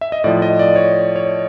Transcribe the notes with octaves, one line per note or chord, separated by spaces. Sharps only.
E5
D#5
A2 F3 D5
D#5
D5
C#5
C#5